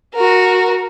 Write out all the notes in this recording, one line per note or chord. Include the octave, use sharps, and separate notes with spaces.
F#4 A#4